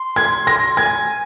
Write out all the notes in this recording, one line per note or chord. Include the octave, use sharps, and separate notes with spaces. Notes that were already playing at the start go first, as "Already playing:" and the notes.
Already playing: C6
G#6
A#6
G#5 G#6